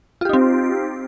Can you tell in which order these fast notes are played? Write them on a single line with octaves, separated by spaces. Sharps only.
F4 G4 D#4 C4